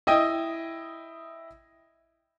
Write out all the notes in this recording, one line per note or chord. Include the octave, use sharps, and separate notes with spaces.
E4 D#5 G5 D#6